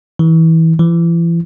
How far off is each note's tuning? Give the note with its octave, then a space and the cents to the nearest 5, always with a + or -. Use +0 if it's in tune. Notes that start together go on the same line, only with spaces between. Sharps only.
E3 -25
E3 +35